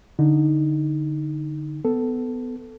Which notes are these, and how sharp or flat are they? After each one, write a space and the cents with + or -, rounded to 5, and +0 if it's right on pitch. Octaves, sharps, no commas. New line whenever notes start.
D3 +0 D#4 +0
B3 +20 A4 +0